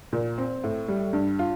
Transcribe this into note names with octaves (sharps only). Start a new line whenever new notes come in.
A#2
C4
A2
G3
G2
F4